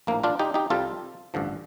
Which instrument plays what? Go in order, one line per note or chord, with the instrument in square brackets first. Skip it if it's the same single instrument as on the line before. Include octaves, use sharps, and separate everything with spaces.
[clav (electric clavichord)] A#1 A2 F3 A#3
D4 F4
D#4 G4
D#4 G4
C2 C3 G3 F4 A4
A1 G2 D3 F3